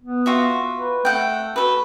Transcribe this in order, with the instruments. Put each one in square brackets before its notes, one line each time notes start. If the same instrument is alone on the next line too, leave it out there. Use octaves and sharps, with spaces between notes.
[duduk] B3
[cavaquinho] F4 F#4 E5
[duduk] B4
[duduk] A3 [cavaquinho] A4 F#5 G5
[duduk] F#4 [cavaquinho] A4 B4